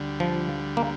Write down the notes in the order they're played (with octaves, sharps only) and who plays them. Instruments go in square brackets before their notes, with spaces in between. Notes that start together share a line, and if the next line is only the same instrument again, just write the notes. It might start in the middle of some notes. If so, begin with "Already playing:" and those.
Already playing: [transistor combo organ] D2 D3 G3
[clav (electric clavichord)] F3
A#3